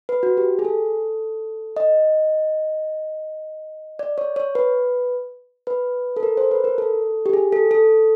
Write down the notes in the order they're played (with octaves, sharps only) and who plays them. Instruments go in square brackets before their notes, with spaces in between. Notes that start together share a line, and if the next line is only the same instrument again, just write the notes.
[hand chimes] B4
F#4
G4
G#4
A4
D#5
D5
C#5
C#5
B4
B4
A4
A#4
C5
B4
A#4
A4
G4
G#4
A4
A4